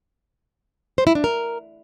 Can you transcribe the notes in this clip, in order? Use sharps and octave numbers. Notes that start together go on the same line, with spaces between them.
C5
E4
D4
A#4